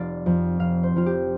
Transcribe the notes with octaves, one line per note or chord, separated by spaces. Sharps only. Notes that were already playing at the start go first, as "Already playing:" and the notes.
Already playing: F1 D5 F5
F2 F3
F1 F5
C5
F2 F3 F4
G4